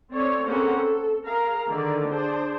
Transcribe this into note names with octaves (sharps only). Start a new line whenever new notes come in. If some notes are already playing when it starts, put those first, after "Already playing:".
C4 A4 C#5 D5
A#3 C4 C#4 G#4 A4 F#5
A4
G#4 A#4 F5 A#5
D3 D#3 D5
D4 G#4 C5